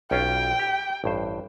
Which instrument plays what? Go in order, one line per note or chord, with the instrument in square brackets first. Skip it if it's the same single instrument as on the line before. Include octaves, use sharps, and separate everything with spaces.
[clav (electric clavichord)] B1 C#4 F4 [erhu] G5
[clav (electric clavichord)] G4
A1 G2 C5